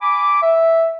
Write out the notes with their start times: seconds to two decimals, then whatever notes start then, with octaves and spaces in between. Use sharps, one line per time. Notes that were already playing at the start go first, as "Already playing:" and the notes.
0.01 G#5 B5 D6
0.41 E5